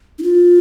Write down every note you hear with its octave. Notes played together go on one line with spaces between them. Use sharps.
D#4
F4